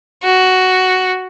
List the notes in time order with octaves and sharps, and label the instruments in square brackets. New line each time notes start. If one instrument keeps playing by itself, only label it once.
[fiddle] F#4